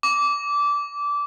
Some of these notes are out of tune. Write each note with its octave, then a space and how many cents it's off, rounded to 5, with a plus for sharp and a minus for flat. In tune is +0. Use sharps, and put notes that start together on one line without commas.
D6 -20